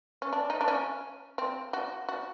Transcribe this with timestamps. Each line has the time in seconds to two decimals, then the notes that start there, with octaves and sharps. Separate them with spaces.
0.22 C#4
0.33 D4
0.50 D#4
0.61 D4
0.68 C#4
1.38 C4
1.73 F#4
2.09 F#4